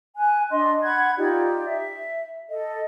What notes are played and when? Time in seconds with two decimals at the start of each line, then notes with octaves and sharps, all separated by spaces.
0.17 G#5 F#6
0.50 D4 D#5 C6
0.83 F#5 B5 F#6 G#6
1.17 D#4 F4 G4 D5
1.66 E5
2.49 A4 D#5